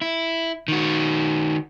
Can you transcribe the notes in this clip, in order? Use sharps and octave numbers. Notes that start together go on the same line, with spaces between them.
E4
D#3 F#4